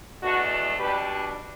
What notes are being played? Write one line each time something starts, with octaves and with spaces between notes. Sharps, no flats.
E2 B2 A3 D4 F#4
B2 G3 D4 G4 B4